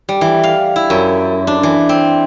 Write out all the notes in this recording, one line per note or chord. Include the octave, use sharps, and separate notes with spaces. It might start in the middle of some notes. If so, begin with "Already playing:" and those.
G3
E3
F5
E4
F#2
D4
E3
C4